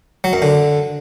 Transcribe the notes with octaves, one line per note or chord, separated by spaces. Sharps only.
F#3
F#2
D3